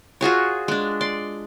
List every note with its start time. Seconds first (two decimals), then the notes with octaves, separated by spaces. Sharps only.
0.21 F4 F#4 G#4 C#5
0.68 G#3 D4
1.01 D5 C6